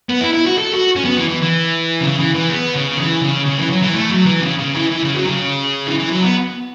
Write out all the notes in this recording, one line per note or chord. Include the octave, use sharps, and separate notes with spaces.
B3
E4
E4
F#4
A4
F#4
C#4
B3
E3
E3
E3
C#3
E3
E3
B3
C#3
E3
C#3
C#3
E3
F#3
E3
A3
F#3
E3
C#3
C#3
E3
E3
C#3
F#3
C#3
E3
E3
F#3
B3